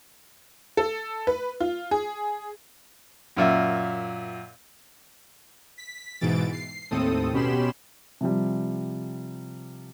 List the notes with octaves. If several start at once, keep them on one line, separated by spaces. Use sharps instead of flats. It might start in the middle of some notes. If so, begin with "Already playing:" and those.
A4
B4
F4
G#4
F#2 A#2 E5
B6
G#2 B2 E3 A6 D7
C7
D#2 A2 C4 A4 D#6
B2 C#4 G4 B5 C6 E7
C3 F3 G3